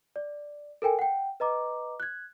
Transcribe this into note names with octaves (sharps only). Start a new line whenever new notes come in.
D5
A4 A#4 G5 G#5
F#5 G5
B4 D#5 A#5 D6
F#6 G#6